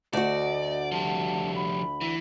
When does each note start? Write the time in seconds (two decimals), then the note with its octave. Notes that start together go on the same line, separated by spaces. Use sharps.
0.13 D2 F#4 D5 D#5
0.92 F3 G3 A5
1.55 B5
2.01 E3